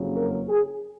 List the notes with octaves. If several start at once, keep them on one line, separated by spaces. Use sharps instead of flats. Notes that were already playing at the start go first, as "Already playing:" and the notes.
Already playing: F#1 F2 C#3 F#3
A#4
G#4